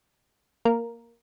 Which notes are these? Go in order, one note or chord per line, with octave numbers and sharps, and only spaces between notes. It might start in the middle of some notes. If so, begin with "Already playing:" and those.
A#3 A#4